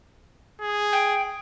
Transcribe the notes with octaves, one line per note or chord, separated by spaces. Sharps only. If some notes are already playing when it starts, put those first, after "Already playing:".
G#4
G5